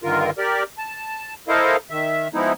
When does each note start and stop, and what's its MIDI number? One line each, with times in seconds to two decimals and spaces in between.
0.03 0.30 43
0.03 0.30 50
0.03 0.30 51
0.03 0.30 65
0.03 0.30 70
0.38 0.63 67
0.38 0.63 70
0.38 0.63 74
0.78 1.34 81
1.48 1.77 64
1.48 1.77 69
1.48 1.77 70
1.48 1.77 72
1.48 1.77 75
1.48 1.77 77
1.90 2.28 51
1.90 2.28 76
2.34 2.53 53
2.34 2.53 56
2.34 2.53 59
2.34 2.53 63
2.34 2.53 64